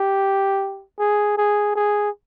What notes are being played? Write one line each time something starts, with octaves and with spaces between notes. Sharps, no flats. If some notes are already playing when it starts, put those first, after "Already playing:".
Already playing: G4
G#4
G#4
G#4